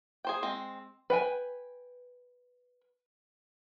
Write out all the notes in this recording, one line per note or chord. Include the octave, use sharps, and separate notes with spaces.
G#4 C5 G5
G#3 C4
B4 G5 G#5